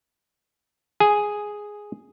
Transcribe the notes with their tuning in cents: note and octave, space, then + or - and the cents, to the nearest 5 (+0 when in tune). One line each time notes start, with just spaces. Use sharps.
G#4 +0 G#5 +0